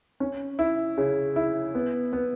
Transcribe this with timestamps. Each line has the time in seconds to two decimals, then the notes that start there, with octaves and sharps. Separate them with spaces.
0.20 C#4
0.59 E4
0.98 C#3
1.36 E4
1.75 B3
2.13 B3